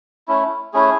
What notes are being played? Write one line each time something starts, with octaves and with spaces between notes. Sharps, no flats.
A3 C#4 E4
A3 C#4 E4 G#4